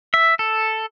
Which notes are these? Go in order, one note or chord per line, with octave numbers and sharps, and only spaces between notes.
E5
A4